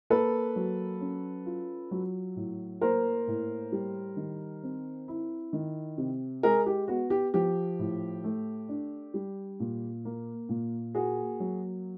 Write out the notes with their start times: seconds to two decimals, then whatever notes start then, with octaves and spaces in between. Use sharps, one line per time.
0.10 A#3 A4 B4
0.56 F#3
1.01 C#4
1.46 F4
1.91 F#3
2.36 A2
2.81 A#3 A#4 C5
3.27 A2
3.72 G3
4.17 D#3
4.63 C4
5.08 E4
5.53 D#3
5.98 C3
6.43 G#3 G#4 A#4
6.66 G4
6.88 B3 F#4
7.10 G4
7.34 F3 G4
7.79 A2
8.24 A3
8.69 D4
9.14 G3
9.60 A#2
10.05 A#3
10.49 A#2
10.95 A#3 F#4 G#4
11.40 F#3